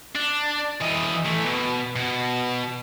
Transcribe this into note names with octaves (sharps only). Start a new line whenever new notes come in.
D4
E3 D#5
E3 A3
B2
B2